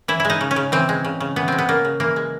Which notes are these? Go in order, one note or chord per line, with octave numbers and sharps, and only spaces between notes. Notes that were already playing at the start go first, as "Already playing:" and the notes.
E3 E4
G#3 E4
D#4
C#3
C#4
C#3
E3 C4
G#3
C#3
C#3
E3 B3
G#3 C4
B3
C#3 A#3
C#3
E3 A#3
G#3